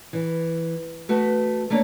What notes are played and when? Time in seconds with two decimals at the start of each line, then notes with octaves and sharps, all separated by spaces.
0.13 E3
1.09 A3 B3 F#4 B4
1.70 A3 A#3 D4 A#4 C#5